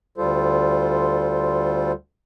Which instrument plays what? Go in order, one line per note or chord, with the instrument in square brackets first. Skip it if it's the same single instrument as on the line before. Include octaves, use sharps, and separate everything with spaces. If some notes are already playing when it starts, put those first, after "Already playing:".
[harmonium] D2 G3 F4 A4 C5